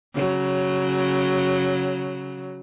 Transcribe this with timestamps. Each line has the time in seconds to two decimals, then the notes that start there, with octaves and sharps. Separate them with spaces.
0.14 C#3 F#3